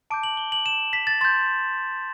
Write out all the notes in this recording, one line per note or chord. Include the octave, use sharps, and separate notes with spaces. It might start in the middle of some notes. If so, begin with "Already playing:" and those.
A5 D6 G6 D7
F#7
G7
F#7
E7
B6
A6
C6 G6 A6